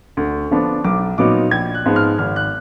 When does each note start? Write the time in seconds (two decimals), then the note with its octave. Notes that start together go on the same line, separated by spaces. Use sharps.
0.17 D2
0.51 D3 F3 B3 D4
0.84 B1 D6
1.18 A#2 F#3 B3 D#4 D6
1.51 A#1 G#6
1.75 F#6
1.85 G#2 F3 G#3 B3
1.96 F6
2.19 G#1 F6
2.36 F#6